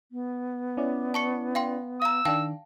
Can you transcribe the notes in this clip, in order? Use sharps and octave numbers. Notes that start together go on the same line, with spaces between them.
B3
C#4 E4 D5
A5 C#6 C#7
F5 G5 C6
F5 A#5 E6
D#3 D4 F5 G5 A5